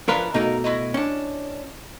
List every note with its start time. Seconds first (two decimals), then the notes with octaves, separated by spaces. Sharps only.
0.08 E3 F3 D4 F4 A#4 B4
0.34 B2 A3 A#3 D#4 A#4
0.64 E4 F#4 D#5
0.94 C#4 D4